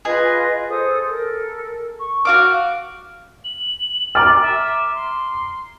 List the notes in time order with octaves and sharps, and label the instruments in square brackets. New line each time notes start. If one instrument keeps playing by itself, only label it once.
[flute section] F4 B4 D#5 [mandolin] G#4
[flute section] A4 C5 D#6
A4 A#4
C#6
[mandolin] F#4 F5 D6 [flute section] F#5 F6
[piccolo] F#7
[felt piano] A#5 D6 F6 [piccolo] A6
[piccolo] E5
C6